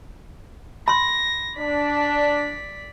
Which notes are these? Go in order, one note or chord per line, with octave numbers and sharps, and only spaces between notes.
B5 C6 A#6
D4 D5 B6